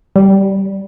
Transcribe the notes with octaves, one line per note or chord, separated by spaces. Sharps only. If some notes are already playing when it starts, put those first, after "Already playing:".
G3